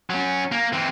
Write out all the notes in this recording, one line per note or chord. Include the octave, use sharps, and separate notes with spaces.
F#3 C#4
A#3
E3 C4